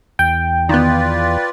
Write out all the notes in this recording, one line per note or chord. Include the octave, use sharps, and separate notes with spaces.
E2 G5
D#3 B3 F4 B4 D5